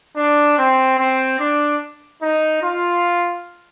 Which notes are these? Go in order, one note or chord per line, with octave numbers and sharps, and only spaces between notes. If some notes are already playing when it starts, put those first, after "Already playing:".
D4
C4
C4
D4
D#4
F4